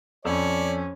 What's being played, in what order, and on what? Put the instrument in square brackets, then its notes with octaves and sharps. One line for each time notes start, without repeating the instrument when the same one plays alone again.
[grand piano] F2 [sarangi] C#4 [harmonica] C#5 D5